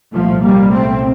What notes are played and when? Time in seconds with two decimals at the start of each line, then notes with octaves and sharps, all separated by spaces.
0.12 C2 A#2 F3 A3
0.41 G3 A#3
0.69 A3 C4